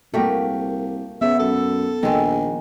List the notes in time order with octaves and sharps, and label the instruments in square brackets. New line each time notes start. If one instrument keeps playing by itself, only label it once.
[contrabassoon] C2 [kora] A3 G4 A#4 [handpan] A#3 F#4
[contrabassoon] C#3 [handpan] B3 [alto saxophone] E5
[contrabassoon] F#2 [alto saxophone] A4
[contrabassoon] A#1 [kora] D#3 G#3